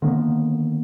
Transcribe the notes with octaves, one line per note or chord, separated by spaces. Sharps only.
D3 D#3 A#3 B3